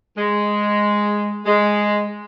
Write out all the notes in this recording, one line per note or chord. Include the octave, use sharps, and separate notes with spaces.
G#3
G#3